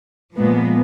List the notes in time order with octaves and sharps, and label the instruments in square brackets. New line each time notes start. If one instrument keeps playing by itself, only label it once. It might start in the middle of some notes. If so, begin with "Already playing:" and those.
[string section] A#2 F3 G#3 B3